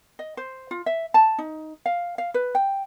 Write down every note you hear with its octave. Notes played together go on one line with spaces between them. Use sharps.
D#5
C5
F4
E5
A5
D#4
F5
F5
B4
G5